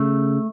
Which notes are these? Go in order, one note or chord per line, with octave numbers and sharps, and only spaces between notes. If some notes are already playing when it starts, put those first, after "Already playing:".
Already playing: C#3 A3